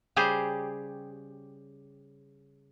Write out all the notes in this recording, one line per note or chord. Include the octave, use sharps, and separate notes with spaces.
C#3 G3 G4 G#4 C5